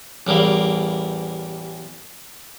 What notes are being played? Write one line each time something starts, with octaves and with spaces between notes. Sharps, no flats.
A1 E2 G3 A#3